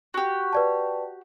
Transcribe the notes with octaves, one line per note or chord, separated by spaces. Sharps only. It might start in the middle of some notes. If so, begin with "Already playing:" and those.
F#4 G4
B4 D5 A5